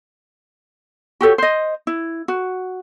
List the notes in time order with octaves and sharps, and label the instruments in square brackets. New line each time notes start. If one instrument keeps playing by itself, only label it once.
[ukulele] F#4 G4 A4 C#5
C5 D#5
E4
F#4